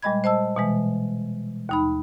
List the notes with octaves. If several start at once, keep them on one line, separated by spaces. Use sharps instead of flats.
A#2 G3 G#3 D#5 B5 G#6
C5 D#5 A5 E6
B2 E3 G#3
D#2 D#4 B5